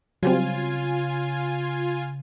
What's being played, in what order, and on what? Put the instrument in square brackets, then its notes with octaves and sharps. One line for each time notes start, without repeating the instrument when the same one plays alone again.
[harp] C#3 [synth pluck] F#3 G3 C4 [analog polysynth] F4 G#5